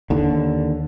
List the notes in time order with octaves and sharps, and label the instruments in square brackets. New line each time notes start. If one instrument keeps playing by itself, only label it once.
[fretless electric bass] D#2 D3